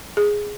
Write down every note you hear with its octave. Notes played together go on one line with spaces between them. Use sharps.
G#4